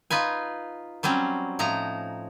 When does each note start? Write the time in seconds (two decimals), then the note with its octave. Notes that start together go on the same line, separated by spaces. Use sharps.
0.10 D#4 F4 B4 G#5
1.03 F#3 G3 C4 C#4
1.59 A2 F3 D#4 A#5